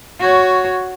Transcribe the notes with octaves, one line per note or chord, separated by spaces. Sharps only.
F#4 C#5